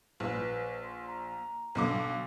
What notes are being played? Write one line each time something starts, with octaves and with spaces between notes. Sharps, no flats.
A#1 B4
C6
A#5
B1 D3 D6